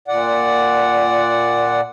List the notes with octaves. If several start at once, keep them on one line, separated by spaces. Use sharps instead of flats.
A#2 D5 F#5